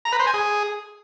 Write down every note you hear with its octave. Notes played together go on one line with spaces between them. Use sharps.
A#5
B4
C5
G#5
G#4